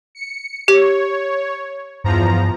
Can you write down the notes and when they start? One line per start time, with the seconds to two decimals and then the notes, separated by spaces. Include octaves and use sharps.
0.15 C#7
0.68 G4 C#5
2.04 E2 G2 F3 A#5